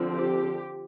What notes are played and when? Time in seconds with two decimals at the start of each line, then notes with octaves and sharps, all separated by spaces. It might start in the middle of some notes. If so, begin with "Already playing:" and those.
Already playing: D3 F3 C4
0.15 G4